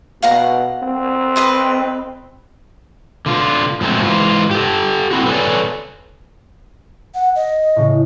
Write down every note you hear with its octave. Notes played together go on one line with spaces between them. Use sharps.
B2 F5 F#5 A#5
C4
B4 D#5 C6
D3 F4
G#2 F3 F#3 A3 C4 C#4
G#2 E3 F4
G4 A4
C4 E4 F#4
A4 B4 C#5 D5 G#5
F#5
D#5
A2 C#3